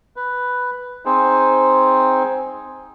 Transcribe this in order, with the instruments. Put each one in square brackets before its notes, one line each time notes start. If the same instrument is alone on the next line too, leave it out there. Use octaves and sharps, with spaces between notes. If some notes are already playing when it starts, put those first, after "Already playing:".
[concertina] B4
C4 D#4 G#4 C5